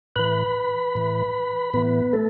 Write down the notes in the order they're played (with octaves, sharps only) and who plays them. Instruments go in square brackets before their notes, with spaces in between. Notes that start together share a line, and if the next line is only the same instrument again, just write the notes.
[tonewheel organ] A2 E3 B4 B5
A2 E3
A2 E3 B3 B4
A3 A4